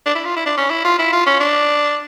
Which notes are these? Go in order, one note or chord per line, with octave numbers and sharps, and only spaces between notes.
D4
E4
F4
E4
D4
C#4
E4
F4
E4
F4
C#4
D4